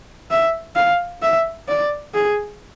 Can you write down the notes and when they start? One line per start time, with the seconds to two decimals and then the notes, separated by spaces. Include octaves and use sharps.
0.31 E5
0.75 F5
1.22 E5
1.68 D5
2.14 G#4